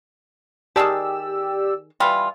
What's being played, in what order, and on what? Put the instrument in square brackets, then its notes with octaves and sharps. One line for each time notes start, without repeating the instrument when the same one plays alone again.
[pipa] D#3 G#4 A5 [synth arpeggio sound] G4 D5 E6
[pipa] E3 G3 F4